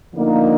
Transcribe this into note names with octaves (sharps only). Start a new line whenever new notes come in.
D3 F3 A#3 D#4